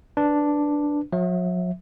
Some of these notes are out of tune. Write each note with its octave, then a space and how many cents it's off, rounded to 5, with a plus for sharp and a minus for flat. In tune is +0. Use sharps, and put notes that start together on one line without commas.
D4 +0 B4 +0
F#3 -40 E5 -10